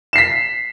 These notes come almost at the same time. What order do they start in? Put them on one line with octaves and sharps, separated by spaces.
E7 C7 B6